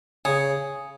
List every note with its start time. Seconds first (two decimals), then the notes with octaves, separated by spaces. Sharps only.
0.25 C#3 G#4